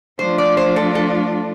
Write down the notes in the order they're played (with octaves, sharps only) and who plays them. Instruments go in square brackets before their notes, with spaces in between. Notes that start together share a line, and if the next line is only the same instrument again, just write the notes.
[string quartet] F3 A3 D4 F4 [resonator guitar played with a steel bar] C5
[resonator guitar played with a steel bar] D5
C5
A4
A4